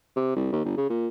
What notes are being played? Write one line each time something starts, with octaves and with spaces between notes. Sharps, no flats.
C3
C2
D#2
G1
C#3
A#2